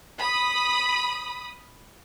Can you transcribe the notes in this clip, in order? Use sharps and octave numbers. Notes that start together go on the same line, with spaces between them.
B5 D#6